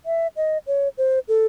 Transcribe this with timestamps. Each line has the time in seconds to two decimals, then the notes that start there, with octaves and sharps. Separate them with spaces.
0.06 E5
0.36 D#5
0.67 C#5
0.98 C5
1.28 A4